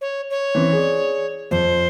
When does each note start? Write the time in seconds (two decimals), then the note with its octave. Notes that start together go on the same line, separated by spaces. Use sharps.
0.01 C#5
0.30 C#5
0.55 E3 C4 C#4
0.73 G#4 D5
1.51 F2 C5